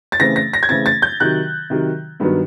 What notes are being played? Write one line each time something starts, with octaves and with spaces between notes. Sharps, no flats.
A6
C#3 E3 A3 C4 A#6
A#6
A#6
G#6
C#3 E3 A3 C4 A6
A6
G6
C3 D#3 F#3 F#6
C3 D#3 F#3
G2 D#3 F#3 B3